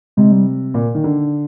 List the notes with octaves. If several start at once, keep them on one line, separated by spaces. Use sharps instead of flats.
C3 G#3
G3
A#2
D#3
D3